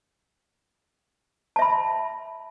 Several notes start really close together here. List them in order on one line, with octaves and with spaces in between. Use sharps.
A5 E5 B5